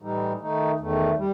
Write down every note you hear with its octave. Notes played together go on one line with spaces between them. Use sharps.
A2 E3 G3 D#4
D#3 A3 D#4
E2 D#3 A3
G3